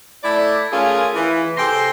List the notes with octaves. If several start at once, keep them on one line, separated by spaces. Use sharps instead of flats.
A3 E4 A4 D5
A3 C#4 F4 G#4 A#4 G#5
E3
C3 G#4 A4 G5 A#5 C6